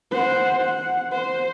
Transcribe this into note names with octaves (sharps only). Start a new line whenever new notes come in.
C5 F#5
F#5
C5